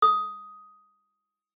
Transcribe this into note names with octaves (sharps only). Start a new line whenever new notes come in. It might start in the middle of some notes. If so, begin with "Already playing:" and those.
D#6